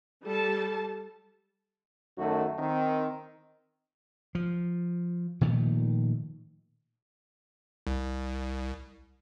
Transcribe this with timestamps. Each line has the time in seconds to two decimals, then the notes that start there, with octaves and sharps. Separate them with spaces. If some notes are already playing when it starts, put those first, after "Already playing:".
0.23 G3 A4 A5
2.17 F#2 D#3 A3 F#4
2.59 D#3 C4
4.35 F3
5.41 A#2 D#3 F3 A3
7.87 C2